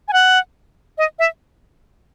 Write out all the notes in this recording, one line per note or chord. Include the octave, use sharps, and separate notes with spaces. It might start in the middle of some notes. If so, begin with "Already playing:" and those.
G#5
F#5
D#5
E5